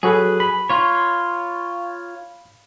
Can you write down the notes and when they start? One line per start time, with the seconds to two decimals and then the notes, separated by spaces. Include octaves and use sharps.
0.03 F#3 F#4 G#4 A4 B4
0.40 B5
0.70 F4 C#5